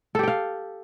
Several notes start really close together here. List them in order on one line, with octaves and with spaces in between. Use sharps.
A4 G4 G5 F5